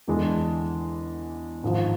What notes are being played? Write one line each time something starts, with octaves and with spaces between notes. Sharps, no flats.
E2 D3 G#3 D4
G#1 G#2 F3